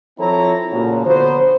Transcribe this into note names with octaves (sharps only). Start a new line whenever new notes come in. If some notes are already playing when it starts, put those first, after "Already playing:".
F3 C4 E4 A4 C#5 A#5
A#2 C#3 F3 F#3
D3 F#3 B3 C5